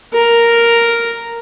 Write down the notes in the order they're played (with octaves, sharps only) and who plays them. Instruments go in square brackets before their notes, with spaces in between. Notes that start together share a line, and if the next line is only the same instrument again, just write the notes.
[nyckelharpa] A#4